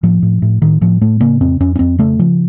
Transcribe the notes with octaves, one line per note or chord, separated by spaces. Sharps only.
A2 F3
A2
A2
A2 D#3
A2 F3
A2 A3
C#3 A#3
F2 C4
F2 C#4
C#4
F2 C4
C#3 A3
C#3 F3